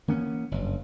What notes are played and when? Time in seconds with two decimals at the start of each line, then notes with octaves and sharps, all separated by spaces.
0.08 E3 A#3 B3 C#4
0.51 F#1 G2